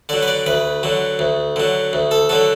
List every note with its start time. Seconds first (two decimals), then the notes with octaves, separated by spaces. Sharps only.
0.09 D3 F#3 D5
0.22 B4
0.28 D5
0.46 D2 B4
0.83 D3 F#3
1.19 D2
1.56 D3 F#3
1.93 D2
2.11 A4
2.29 D3 F#3 A4